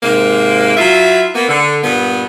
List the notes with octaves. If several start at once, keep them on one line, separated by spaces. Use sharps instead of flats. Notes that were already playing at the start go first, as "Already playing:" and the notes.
G#2 C3 A#3
F#3 E4 F4 E5
A#3 B3
D3
G2 A#2 B3